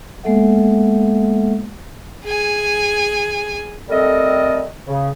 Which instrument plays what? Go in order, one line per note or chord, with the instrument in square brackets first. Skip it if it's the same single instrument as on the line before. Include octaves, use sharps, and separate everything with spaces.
[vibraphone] G#3 A#3 B3 A4 E5 F#5
[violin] G#4 G#5
[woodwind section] G3 A3 C4 A4 A#4 D#5
C#3